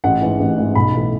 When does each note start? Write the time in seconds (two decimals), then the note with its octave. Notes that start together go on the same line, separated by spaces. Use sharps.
0.04 A1 F#5
0.22 G#2 E3
0.40 A1
0.58 G#2 E3
0.75 B1 B5
0.94 A2 E3